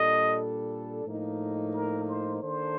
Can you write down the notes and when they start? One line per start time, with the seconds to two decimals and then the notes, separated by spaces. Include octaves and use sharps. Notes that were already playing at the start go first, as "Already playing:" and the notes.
Already playing: A#2 G3 D4 A4 D#5
1.05 A2 F3 A#3 D#4
1.74 A#4
2.08 C5
2.42 D#3 A#3 D4 A4 C5